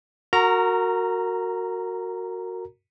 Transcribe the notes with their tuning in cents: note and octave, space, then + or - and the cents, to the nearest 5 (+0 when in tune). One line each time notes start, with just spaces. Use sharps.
F#4 -10 A#4 -25 A#5 +0